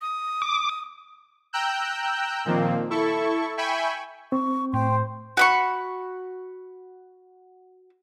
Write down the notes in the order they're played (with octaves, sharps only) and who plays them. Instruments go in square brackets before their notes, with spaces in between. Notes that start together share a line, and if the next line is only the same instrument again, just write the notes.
[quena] D#6
[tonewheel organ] D6
[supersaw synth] G5 A#5 E6 F#6 G6
A#2 D#3 F3 A#3 C4
E4 A4 C#6
E5 G5 G#5 B5 C#6
[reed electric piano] C4 [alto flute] C#6
[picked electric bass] A2 [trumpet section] C5 [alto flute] G5
[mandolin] F#4 B5 C#6